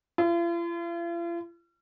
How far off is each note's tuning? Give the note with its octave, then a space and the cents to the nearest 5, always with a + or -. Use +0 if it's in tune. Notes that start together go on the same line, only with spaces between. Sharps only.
F4 -45